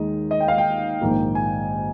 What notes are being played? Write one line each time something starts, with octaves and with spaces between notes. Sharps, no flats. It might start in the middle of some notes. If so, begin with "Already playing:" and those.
Already playing: D#2 D#3 G#3 D#4 D#5
D#5
G5
F5
G5
A#1 G#2 D#3 A#3 D#4
G#5